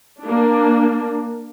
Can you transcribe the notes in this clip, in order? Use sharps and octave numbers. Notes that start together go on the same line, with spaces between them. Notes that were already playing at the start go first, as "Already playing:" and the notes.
A#3 D4